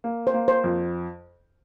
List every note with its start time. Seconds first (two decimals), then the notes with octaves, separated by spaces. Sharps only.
0.04 A#3
0.27 C5
0.34 A#3
0.48 C5
0.64 F2